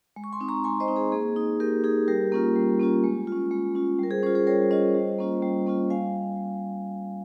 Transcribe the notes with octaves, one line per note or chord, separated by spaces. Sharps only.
G#3
C#6
G#5 C6
C4 D#4
A#5 C#6
G#3 G#5 C6
C5 D#5
C4 D#4
G#4 C5
A#3 G#4
D#4
A#3 G4 A#4
D#4 G#4
G3 G4 A#4
A#3 C#4 F4
G3
A#3 C#4 F4
G#3
F4
C#4
G#3
C#4 F4
G3 A#4
G#4 C5
C#4 F4 G#4 C5
G#4 C5
G3 A#4 C#5
C#4 F4 C5 D#5
G3
A#3 C#4 F4
G3
A#3 C#4 F4
G3 F5 G#5